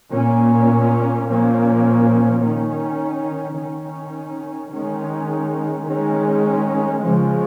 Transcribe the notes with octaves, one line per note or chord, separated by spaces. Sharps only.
A#2 A#3 C#4
A#2 F3 A#3 C#4
D#3 C#4
D#3 C#4
D#3 G#3 C#4
D#3 G#3 C#4
C#3 F3 G#3 C#4